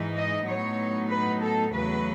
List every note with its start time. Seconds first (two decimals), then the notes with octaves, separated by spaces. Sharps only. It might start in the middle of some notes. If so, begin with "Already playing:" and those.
Already playing: G#2 E3 G#3 D#4
0.16 D#5
0.48 A2 F#3 B3 D#4 C#5
1.10 B4
1.42 A4
1.73 E2 C#3 F#3 A3 B4